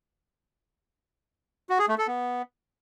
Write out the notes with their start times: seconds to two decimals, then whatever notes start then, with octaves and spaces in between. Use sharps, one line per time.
1.70 F#4
1.79 G#4
1.89 A3
1.98 A4
2.08 B3